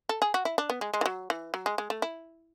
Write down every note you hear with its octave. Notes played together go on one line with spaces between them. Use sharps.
A4
G#4
F#4
E4
D4
B3
G#3
G#3
E3
F#3
E3
F#3
G#3
G#3
A3
E4